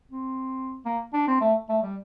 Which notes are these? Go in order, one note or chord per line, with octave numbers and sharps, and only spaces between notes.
C4
A#3
D4
C4
A3
A3
G3